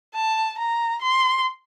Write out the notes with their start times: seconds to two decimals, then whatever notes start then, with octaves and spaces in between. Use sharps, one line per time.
0.14 A5
0.58 A#5
1.01 C6